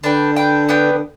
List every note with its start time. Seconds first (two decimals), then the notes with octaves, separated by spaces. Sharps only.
0.03 D3 D4 B4 G5
0.36 D4 B4 G5
0.69 B3 D4 B4 G5
0.92 D3